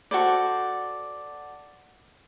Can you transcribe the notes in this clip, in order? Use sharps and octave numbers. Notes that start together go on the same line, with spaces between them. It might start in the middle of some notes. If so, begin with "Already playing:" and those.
F#4 A4 C5 D5